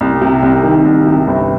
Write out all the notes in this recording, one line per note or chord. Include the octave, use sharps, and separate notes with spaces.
C2
C3
C2
D#3
C2
C3
G1